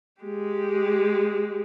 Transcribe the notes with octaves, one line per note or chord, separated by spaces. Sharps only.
G#3 G4